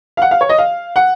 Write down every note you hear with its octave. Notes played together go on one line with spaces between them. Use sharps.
F5
F#5
F5
C#5
D#5
F5
F#5